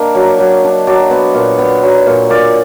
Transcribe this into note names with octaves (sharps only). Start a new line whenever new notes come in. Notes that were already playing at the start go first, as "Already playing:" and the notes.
Already playing: A#3 D4 D#5
F#3
F#3
D4
F#3 D5
B3
A#2
B3
F#3
A#2
A#2 D5